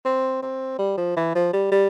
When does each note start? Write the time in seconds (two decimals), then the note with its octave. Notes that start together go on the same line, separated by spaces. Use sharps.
0.05 C4
0.43 C4
0.79 G3
0.97 F3
1.17 E3
1.35 F3
1.53 G3
1.71 G3